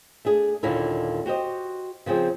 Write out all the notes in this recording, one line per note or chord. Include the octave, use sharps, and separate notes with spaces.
A3 D4 G#4
D#2 A#2 D3 C#4 D#4 E4
F#4 G4 C5 D#5
C#3 F3 C4 G#4